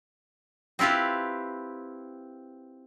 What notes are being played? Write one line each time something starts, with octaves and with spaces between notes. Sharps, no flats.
C4 E4 F4 G4 B4